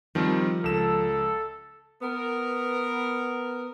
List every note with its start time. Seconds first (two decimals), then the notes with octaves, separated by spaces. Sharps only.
0.15 D#3 F3 G3 C4
0.64 C#2 A4 E7
2.02 B3 A#4